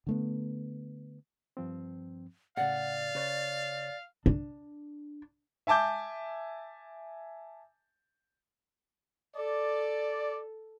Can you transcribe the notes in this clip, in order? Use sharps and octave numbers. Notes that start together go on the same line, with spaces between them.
D3 A3 B3
G2 F3 C4
A2 C#3 D5 F5 F#5
C#3 B4 C#5 A6
D4
E5 G#5 A5 D6 G6
A4 D5